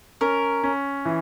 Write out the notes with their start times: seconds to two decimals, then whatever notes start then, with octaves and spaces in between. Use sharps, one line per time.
0.21 C#4 A#4
0.63 C#4
1.05 E3